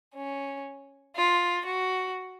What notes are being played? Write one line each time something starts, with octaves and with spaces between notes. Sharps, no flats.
C#4
F4
F#4